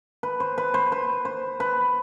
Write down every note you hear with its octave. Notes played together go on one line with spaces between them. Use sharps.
B4
C5
B4
C5
B4
C5
B4